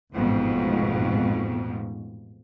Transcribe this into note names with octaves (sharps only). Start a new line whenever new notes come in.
A1 F2 G#2 B2